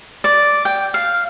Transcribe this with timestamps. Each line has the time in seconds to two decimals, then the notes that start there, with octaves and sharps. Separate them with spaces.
0.24 D5
0.65 G5
0.94 F5